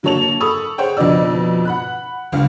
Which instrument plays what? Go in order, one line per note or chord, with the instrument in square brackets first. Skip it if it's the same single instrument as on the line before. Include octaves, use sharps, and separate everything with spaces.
[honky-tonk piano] D3 F#3 A#3 C#5 A5 F7
A4 B5 C#6 D#6 E6
G#4 C5 C#5 F#5 G5
F2 B2 D3 D#4 D5 E6
F#5 B5 F#6
F#1 C#2 G2 F5